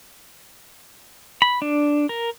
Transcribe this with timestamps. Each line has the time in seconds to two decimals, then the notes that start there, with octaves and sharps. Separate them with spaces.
1.42 B5
1.62 D4
2.09 A#4